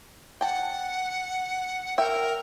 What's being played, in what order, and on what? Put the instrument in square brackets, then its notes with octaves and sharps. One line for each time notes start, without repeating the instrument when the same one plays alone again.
[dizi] F#5 [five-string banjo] G5 A5
[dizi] A#4 [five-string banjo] E5 G5